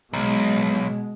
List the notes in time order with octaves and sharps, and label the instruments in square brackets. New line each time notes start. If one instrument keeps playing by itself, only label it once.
[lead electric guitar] B1 [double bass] B2 G#3